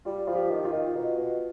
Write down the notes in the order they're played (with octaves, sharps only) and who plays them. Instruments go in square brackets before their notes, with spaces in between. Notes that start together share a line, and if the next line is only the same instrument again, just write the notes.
[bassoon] G3 [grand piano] F4
[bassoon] F3 [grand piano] F4
[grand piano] G4
[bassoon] D#3
[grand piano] F4
[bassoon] D#3
B2
B2